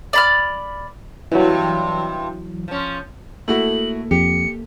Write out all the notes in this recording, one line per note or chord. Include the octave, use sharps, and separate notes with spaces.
D5 B5 F6
G2 C3 E3 F#3
F3 C#4
A3 A#3 E4 F#4 A4 F#7
F2 G4 C#7